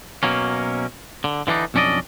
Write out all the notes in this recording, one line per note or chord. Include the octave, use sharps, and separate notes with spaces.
B2 F#3 A#3 C#4
D3
D3 E3 A#3 D4 D#4
B1 F2 C#4 D4 D5 D#5